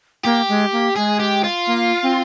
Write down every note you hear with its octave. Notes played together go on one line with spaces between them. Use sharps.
A#3 G4
G#3
A#3
G#3 G#4
G4
F4
A#3
C4